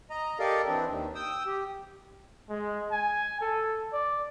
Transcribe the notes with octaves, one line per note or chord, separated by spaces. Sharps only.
D#5 A#5
G4 A4 A#4 D5 D#5 F5
E3 C4 D4
D#2 D#3
G5 D#6 E6
G4
G#3
G#5
A4
D5